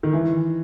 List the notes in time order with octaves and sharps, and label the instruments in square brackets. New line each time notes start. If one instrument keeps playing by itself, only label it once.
[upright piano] D#3
E3